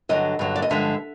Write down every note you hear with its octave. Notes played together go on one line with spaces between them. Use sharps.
G2 D3 F#3 D#5
G2 D3 F#3
D5
D#5
G2 D3 F3 G#3 E5